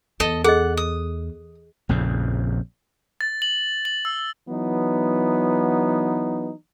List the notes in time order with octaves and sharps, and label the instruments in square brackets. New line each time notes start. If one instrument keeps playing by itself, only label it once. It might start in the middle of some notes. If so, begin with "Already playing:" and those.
[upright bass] E2 [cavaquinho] A4 D#5
[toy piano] G#4 D#5 [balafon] A4 [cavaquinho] F#5
[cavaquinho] D#6
[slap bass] A#1 F2 C#3
[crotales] A6
F#7
F#7
E6
[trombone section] E3 F#3 B3 D#4